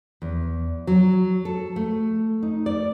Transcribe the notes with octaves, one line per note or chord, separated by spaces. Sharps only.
E2
F#3
A4
A3
D#4
D5